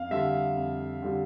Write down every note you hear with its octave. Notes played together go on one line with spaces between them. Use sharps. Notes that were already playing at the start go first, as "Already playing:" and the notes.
Already playing: F2 F5
D3 G3 E5
F2
D3 G3